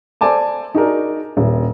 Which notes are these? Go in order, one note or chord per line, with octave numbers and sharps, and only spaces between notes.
A4 C5 D5 G#5 A5 D6
D#4 F#4 G#4 A#4 D5
D#1